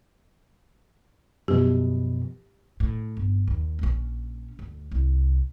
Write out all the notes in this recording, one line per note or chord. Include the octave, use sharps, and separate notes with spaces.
F#2 B2 F3 G4
A2
G1
D#2
A#1 C#4
D2
C2